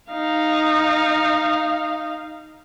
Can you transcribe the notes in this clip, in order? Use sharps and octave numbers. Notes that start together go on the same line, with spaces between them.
D#4 F5